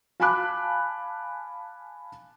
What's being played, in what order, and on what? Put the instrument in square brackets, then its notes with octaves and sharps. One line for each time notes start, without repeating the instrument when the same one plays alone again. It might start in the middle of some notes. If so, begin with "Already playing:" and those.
[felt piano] F5 G#5 A5 B5 D6 F#6